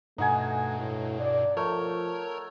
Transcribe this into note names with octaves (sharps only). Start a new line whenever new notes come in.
G2 B2 A3 D#4 F#5 G#5
A2
D5
F3 A3 A#4 C#5 A#5